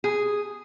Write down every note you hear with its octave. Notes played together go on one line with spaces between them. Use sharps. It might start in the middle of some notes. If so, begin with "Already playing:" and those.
G#4